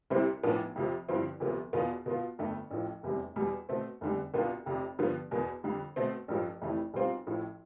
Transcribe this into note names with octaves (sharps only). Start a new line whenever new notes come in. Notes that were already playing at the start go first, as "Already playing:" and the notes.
C2 C3 G3 C4 E4
B1 A2 F3 B3 D4
F2 C3 F3
G2 D3 F3 C4 E4
D2 C3 F3 B3
E2 B2 B3 F4
B2 B3 F4
G1 F2 D3 A3
A1 A2 F3
F1 E2 C3 G3
E2 B2 G3
B2 A3 C4
F1 E2 D3 G3
C2 B2 B3 D4 F4
F1 F2 C3
G2 D3 F3 B3
E2 B2 B3
F2 D3 G3
B2 A3 C4
A1 G2 F3
F1 F2 C3 E3 A3
B1 B2 G3 C4 F4
A1 A2 F3